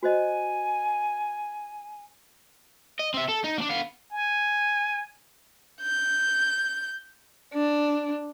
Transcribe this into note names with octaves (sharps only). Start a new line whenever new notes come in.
F#4 C5 D#5 G#5
D#5
C4 E5
A4
D#4
A#3 D4
B3 F5
G#5
G6
D4